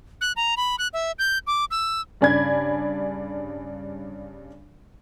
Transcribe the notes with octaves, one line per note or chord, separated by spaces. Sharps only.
F#6
A#5
B5
F#6
E5
G6
D6
E6
G2 C#3 D5 G#5 B5 G#6